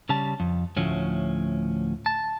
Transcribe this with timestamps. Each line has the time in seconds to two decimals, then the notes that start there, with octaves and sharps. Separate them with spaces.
0.09 C#3 G3 A5
0.40 F2
0.76 D2 A2 F3 C#4
2.06 A5